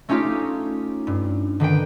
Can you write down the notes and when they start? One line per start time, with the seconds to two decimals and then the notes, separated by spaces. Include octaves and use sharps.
0.09 A3 C#4 D#4 F4 G4
1.07 G2
1.60 D3 D#3 B4 G5